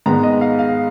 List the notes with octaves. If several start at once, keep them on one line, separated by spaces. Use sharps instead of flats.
G#2 D#3 G#3 B3 A#5
D#5
F5
F5